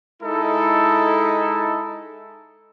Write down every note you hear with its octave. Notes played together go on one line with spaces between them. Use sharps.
G#3 D#4 E4 A4